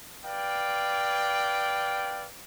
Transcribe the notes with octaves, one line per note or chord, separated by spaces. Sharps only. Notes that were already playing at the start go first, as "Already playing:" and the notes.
B4 D5 F5 G5